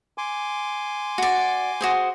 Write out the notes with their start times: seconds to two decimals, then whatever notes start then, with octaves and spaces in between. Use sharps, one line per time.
0.18 G#5 C6 D6
1.18 F#4 D5
1.81 F#4 G#4 C5